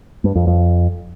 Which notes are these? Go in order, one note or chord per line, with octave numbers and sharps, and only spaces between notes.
G2
F2
F2